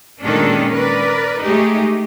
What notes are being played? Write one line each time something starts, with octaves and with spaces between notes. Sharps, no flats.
A#2 D#3 G#3 C#4 D4 A4
A#4 B4 D5
G#3 A3 D#4 G4 G#4